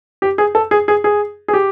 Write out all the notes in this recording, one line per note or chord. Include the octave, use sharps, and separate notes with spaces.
G4
G#4
A4
G#4
G#4
G#4
G#4
G4